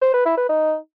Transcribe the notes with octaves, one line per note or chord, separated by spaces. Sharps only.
C5
B4
E4
B4
D#4